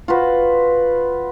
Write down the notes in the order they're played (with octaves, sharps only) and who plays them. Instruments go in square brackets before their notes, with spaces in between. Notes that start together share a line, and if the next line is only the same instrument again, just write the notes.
[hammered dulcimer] F4 F#4 B4